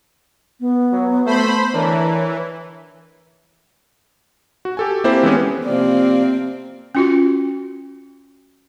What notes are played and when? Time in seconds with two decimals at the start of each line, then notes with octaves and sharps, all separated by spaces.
0.60 B3
0.93 F#3
1.26 A3 C5 B5
1.74 D3 E3 D4 A#4 C#5
4.65 F#4
4.77 G4 A4 G#5
5.04 A#3 C4 E4 G4 A4 C5
5.23 E3 G#3 B3 C#4
5.65 C3 F3 A#3 C4 D5
6.95 C#4 F4 F#4